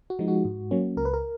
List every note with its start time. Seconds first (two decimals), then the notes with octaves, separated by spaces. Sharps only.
0.10 F#4
0.19 F3 G#3 D#4
0.28 F#4
0.45 G#2
0.71 F#3 A#3 C#4
0.97 C#2 A#4
1.05 B4
1.14 A#4